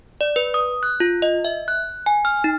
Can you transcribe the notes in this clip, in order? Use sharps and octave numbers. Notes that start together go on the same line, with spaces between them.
D5
B4
D#6
F#6
F4
D#5
E5
F#6
G#5
F6
D#4